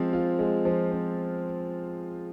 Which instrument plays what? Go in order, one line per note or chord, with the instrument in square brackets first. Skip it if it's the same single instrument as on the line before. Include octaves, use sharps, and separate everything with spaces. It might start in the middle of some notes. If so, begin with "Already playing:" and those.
Already playing: [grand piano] F3 G#3 C4
F4
G#3
F3
C4